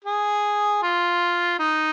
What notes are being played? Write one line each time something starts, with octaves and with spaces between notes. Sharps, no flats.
G#4
F4
D#4